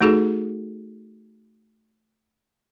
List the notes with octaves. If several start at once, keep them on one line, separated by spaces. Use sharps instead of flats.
A3 D#4 F#4 G#4 A4